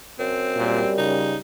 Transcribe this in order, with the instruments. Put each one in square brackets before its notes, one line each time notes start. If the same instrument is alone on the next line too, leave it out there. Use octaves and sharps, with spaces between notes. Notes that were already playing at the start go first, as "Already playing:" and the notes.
[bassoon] F#2 [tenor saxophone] C4
[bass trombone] A#2 [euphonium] G3
[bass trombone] C#3 [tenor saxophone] D#4